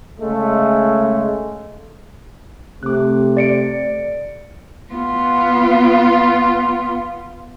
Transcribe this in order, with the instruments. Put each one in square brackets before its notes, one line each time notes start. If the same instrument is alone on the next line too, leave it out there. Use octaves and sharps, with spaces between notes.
[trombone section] C#3 G#3 A3
[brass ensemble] C3 A3 [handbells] D6 F#6
[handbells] D5 C#7 D7
[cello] B3 F4